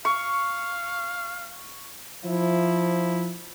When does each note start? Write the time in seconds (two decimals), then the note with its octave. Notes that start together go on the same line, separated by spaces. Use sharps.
0.05 F5 C#6
2.25 F3 E4